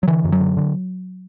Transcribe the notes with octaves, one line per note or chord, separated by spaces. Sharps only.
F#3
D3 E3
F#2
F#3
D3
D3